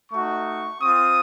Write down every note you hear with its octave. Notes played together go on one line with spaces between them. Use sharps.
A3 D#4 F#4 C#6
C4 F4 D#6